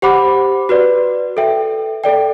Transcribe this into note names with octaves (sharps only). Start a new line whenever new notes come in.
G4 C5 F#5 B5 D6
F#4 B4 D5
A4 E5 G5
A4 D5 G5